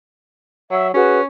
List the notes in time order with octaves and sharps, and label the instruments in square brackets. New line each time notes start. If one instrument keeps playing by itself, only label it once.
[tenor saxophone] F#3 [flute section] E5 E6
[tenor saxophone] C#4 [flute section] F#4 G#4 B4